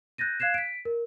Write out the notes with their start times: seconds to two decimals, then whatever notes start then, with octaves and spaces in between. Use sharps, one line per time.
0.18 F#6 G6 A6 A#6 D#7
0.40 F5 F#6 G#6 C7 E7
0.54 B6 D7
0.85 A#4